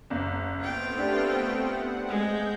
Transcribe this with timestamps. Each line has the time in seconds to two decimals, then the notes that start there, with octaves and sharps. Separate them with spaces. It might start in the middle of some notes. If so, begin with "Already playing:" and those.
0.10 F#1
0.60 A3 B3 C4 F4 G5
0.97 D4 G4
1.49 F#5
2.08 G#3 G6